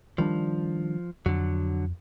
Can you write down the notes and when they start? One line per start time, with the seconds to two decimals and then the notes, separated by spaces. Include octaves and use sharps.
0.18 D#3 F3 G3 D4
1.26 F2 D3 F#3